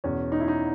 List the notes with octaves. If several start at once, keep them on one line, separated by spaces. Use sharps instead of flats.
E2 B2 C#4
D#4
E4
D#4